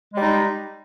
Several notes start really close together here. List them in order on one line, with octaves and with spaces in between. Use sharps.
G#3 G3 D#4